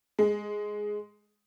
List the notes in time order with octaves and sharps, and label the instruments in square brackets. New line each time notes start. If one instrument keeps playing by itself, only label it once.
[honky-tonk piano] G#3